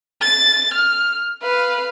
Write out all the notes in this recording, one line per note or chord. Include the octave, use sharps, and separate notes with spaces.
A6
F6
B4 F5